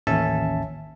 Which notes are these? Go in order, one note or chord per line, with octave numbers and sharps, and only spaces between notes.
A1 D#2 C#4 E5 A5